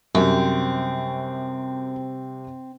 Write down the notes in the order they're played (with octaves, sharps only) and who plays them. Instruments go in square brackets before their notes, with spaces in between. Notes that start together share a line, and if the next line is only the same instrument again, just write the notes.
[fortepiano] F#2 [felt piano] C3 G3 C#6 [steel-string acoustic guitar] C4